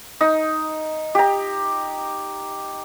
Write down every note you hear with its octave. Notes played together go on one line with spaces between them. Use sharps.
D#4
G4 A#5